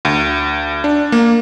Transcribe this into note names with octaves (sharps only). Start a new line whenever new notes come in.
D2
D4
A#3